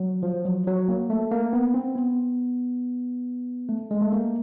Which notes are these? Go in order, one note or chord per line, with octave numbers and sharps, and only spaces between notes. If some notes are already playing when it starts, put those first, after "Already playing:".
Already playing: F#3
F3
F#3
F#3
A#3
A3
A#3
B3
C4
B3
A3
G#3
A3
A#3